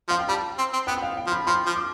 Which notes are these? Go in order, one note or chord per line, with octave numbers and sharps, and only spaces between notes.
F3 F5
G5
G3 A5
C4
C4
B3 G5
F5
G5
F3
B5
F3 C6
F3
D6